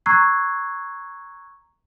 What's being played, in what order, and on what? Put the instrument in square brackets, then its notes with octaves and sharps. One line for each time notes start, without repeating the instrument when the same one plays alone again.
[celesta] A#5 C#6 E6 F#6 G#6 C7